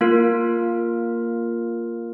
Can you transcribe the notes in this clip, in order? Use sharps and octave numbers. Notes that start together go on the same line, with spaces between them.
A#3 F4 A#4